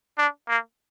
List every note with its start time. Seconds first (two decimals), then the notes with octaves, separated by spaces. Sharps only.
0.18 D4
0.48 A#3